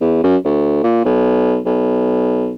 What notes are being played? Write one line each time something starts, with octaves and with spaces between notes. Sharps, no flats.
E2
F#2
D2
A#2
B1
B1